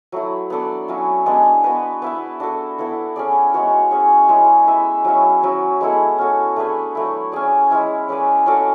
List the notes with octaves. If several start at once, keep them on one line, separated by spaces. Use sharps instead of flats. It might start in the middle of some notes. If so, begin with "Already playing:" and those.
F#3 A3 E4
B3 D4 A4 D5
F#3 C#4 E4
G#3 B3 D4 G#4
B3 F#4 B4
B3 E4 B4 E5
D4 F#4 A4
B3 E4 A4
C#4 G#4 D5
G#3 B3 F#4 C#5
C#4 G#4 C#5
G#3 C#4 E4 G#4
E4 B4 E5
F#3 C#4 E4
F#3 C#4 E4
G#3 B3 E4 A4
C#4 F#4 A4
A3 D4 G#4 B4
F#3 A3 E4
C#4 G#4 D5
G#3 C#4 E4
C#4 G#4 B4 D5
C#4 F#4 A4 D5